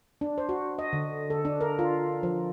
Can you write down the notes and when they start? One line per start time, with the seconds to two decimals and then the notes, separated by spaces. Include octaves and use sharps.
0.21 D4
0.38 C5
0.49 F#4
0.79 D#5
0.93 D3
1.30 A4
1.45 D4
1.61 A#4
1.79 F4
2.23 F3